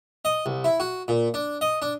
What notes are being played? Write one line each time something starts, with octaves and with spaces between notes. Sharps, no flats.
D#5
C2
E4
F#4
A#2
D4
D#5
D4